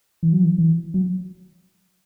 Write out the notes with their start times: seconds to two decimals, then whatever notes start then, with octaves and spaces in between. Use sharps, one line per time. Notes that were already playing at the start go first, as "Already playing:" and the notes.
0.23 E3
0.32 F#3
0.44 E3
0.58 E3
0.94 F#3